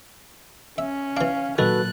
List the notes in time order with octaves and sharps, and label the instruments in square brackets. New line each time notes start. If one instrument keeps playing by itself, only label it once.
[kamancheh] C#4 [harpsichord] E5
[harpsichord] E3 D4 [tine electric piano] F5
[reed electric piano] A#2 F#3 A6 [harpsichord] D#3 [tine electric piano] F#4 A4 B4 [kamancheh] F#6